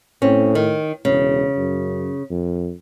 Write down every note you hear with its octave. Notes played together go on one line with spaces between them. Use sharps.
A2 C4 C#4
D#3
E1 C#3
F#2
F2